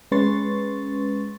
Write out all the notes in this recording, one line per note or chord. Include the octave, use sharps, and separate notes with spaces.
G#3 C#4 B4 C6 C#6 A6